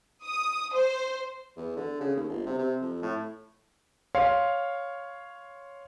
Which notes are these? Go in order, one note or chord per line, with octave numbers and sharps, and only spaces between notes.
D#6
C5
E2
D3
C#3
D#2
G1
C3
C3
F2
A2
C#5 F5 C6